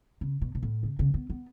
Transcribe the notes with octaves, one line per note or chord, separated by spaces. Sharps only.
C#3
B2
B2
A2
C#3
C#3
B3
B3